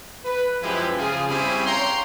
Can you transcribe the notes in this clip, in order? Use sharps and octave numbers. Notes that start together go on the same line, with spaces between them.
B4
F#2 F3 G#3 E4 G4 B4
C#3 F3 G#4
G3 C4 C#4 E4 G4 G#4
C#5 F5 G5 A#5 C6